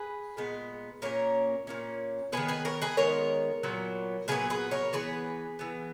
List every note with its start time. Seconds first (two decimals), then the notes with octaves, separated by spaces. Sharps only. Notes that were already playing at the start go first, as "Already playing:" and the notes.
Already playing: G#4 B4
0.37 A#2 G#3 B3
1.02 A#2 A#3 C#4 A#4 C#5
1.67 A#2 A#3 C#4
2.32 D#3 G#3 B3 G#4 B4
2.48 G#4 B4
2.65 A#4 C#5
2.82 G#4 B4
2.97 D#3 G#3 B3 A#4 C#5
3.63 A#2 F#3 B3
4.28 A#2 F#3 B3 G#4 B4
4.50 G#4 B4
4.71 A#4 C#5
4.93 E3 B3 G#4 B4
5.59 E3 B3